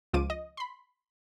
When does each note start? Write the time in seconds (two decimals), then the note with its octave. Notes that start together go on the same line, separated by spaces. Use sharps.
0.13 C#2 F3 F4 D6 D#7
0.30 D#5
0.57 B5 C6